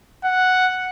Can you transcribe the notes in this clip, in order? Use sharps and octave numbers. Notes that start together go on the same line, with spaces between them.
F#5